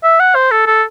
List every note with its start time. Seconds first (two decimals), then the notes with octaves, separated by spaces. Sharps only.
0.03 E5
0.20 F#5
0.35 C5
0.51 A4
0.67 A4